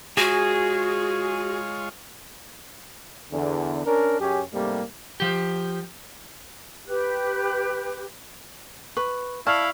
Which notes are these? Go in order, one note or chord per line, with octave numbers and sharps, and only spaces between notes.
G#3 F4 F#4 G#4 C#5
E2 D3
C#4 D4 A#4
F#2 C#4 G4 G#4
G#2 C3 G3 A3 A#3
F3 G4
G4 B4 F#6
B4 C#6
E4 D5 F5 A5 C#6 F6